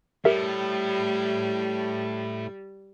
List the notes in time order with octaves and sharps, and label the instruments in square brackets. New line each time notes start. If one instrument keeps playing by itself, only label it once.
[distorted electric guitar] A2 [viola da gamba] G3 [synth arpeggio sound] G4 A#4 E5